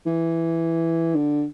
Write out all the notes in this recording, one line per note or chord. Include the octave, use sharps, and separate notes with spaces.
E3
D3